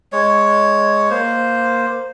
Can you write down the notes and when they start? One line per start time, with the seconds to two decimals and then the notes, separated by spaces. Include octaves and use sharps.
0.12 G#3 C#5
1.10 A#3 C5